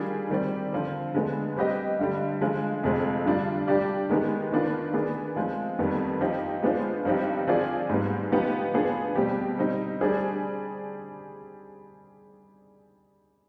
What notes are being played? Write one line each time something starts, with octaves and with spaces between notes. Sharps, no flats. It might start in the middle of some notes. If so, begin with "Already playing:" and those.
Already playing: D#3 G3 D4 F4 G#4
D#3 G3 C4 G4 D5
D3 F3 C4
D3 G#3 B3
G3 C4 G4 B4 D#5
G2 D3 G3
D3 F3 G#3
F2 C3 F3 G#3 C4
G2 D3 G3 D4 F4
G3 D4 G4 D5
D#3 G#3 B3 D#4 G4
D#3 B3 D4 F4 B4
D#3 B3 D4 G#4 B4
F3 G#3 C4
F2 D#3 G3 B3
F3 C4 D#4 G4
G#3 B3 D4 F4 C5
G2 F3 C4 D#4 G4
F3 C4 F4 G#4 D5
G#2 G3 B3
F3 B3 D#4 G4 B4
F3 B3 D4 G#4
B2 G3 C4 G4
G3 C4 D#4
G3 D4 G#4 C5